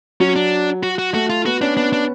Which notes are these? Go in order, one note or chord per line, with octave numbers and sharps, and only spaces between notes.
F#3 C#4
D4
F#4
F#4
A3 F#4
F4
B3 F#4
C#4 D4
B3 D4
D4